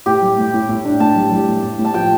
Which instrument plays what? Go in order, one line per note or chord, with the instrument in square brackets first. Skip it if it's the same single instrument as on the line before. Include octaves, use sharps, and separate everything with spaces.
[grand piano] A2 [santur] G4
[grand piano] G3
A2
A2
A2
D4
[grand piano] A2 [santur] A5
[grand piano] G3
G3
A2
A2
A2
[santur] A5
[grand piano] F3 [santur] G5